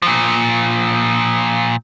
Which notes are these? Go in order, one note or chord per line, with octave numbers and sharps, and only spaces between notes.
A#2 F3